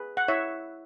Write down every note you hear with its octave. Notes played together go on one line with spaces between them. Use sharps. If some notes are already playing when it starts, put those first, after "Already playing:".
Already playing: G#4 B4
F#5
E4 C#5 E5